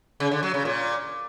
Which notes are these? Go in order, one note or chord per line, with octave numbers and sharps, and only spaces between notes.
C#3
D3
F#3
C#3
A#2